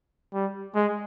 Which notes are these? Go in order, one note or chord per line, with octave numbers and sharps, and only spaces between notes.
G3
G#3